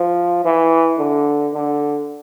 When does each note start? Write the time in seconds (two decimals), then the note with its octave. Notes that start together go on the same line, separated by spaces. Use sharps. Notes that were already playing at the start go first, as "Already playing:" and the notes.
Already playing: F3
0.45 E3
0.99 D3
1.54 D3